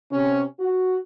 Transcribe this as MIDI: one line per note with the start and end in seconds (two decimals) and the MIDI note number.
0.11 0.42 48
0.11 0.42 61
0.59 0.96 66